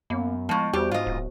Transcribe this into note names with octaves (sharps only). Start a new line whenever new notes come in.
F#2 A#3 B3
A2 F3 G#3 A5 C#6
E2 G3 F#4 G4 C5
G#2 F4 D#5
D1